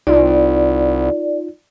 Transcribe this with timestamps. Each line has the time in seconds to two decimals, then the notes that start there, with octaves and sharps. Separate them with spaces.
0.07 C2 D#4 F4 D5